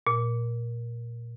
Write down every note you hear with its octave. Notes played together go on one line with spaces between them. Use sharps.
A#2